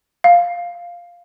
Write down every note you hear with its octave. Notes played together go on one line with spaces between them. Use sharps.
F5